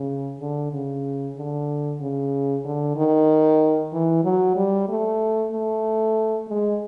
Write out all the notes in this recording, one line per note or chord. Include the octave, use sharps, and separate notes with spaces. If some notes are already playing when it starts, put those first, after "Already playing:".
Already playing: C#3
D3
C#3
D3
C#3
D3
D#3
E3
F#3
G3
A3
A3
G#3